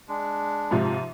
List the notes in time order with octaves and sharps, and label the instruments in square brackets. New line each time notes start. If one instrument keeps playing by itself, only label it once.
[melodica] G#3 D4
[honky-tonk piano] G#2 C3 F3